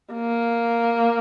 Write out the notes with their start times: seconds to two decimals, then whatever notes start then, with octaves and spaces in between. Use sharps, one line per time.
0.14 A#3